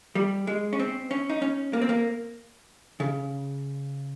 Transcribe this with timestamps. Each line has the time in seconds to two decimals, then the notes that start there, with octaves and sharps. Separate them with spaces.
0.15 G3
0.47 G#3
0.73 C#4
0.80 C4
1.11 C#4
1.30 D#4
1.42 C#4
1.73 A#3
1.81 C4
1.89 A#3
3.00 C#3